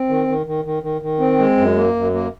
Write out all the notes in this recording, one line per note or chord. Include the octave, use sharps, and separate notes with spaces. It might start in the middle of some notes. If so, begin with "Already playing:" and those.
Already playing: C4
D#3
D#3
D#3
D#3
D#3
D#3
C4
G#3
F#2
A#3
F#2
A#3